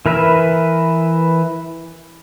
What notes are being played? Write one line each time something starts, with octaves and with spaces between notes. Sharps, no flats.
E3 A#4 B4 E5